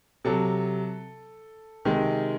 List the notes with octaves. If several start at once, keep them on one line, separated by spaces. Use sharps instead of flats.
C3 F#3 A4
C3 D#3 G#3